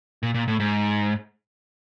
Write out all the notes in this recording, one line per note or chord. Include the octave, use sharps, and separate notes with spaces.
A#2
A#2
A2
G#2